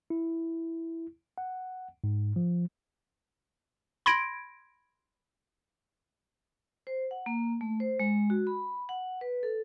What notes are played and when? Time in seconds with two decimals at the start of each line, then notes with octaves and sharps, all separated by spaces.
0.10 E4
1.38 F#5
2.04 G#2
2.36 F3
4.06 B5 C6 G#6 A#6 D7
6.87 C5
7.11 F#5
7.26 A#3
7.61 A3
7.80 C5
7.99 G#3
8.30 F#4
8.47 B5
8.89 F#5
9.21 B4
9.43 A4